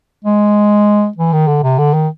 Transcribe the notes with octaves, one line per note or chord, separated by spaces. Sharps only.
G#3
E3
D#3
D3
C3
D3
D#3